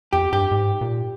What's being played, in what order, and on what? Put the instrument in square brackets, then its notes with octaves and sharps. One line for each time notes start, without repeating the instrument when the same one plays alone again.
[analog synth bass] F2 [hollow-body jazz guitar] G4
[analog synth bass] G2 [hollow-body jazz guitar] G4
[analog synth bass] G#2
A#2